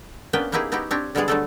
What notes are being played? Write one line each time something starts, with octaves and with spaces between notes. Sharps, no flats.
A#3 B3 C#4 D4 B4 G5
A#3 B3 D#4 E4 G4 G#4
B3 D#4 E4 F#4 G4
C4 D4 G4 C#5
D3 G3 G#3 B3 G#4 D5
D3 F#3 G3 A3 D4 A4